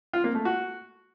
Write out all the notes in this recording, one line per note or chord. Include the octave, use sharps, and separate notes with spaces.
F4
A#3
A3
F#4